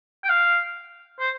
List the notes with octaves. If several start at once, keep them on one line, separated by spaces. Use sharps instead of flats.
G5
F5
C5